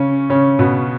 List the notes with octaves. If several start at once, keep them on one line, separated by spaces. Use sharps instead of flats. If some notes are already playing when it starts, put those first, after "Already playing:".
Already playing: C#3 C#4
C#3 C#4
B2 B3